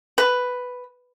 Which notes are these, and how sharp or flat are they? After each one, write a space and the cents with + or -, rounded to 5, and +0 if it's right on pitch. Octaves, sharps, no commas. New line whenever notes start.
B4 +5